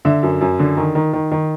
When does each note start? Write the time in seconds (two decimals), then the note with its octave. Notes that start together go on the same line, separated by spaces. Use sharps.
0.05 D3 E5
0.23 F#2
0.41 F#2
0.59 D3
0.77 D#3
0.95 D#3
1.13 D#3
1.31 D#3